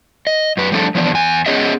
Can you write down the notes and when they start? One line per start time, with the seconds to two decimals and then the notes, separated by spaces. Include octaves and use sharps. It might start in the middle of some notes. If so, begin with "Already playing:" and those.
0.27 D#5
0.57 F#2 B4
0.72 F3 G3 A3 C4 D4 A4
0.95 E3 F3 B3 D4
1.12 E2 G#5
1.46 B3 C#4 G#4 C#5 D#5 E5